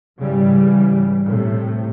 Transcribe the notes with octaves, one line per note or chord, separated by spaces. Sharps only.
G#2 C#3 E3 G3
A2 C3 A3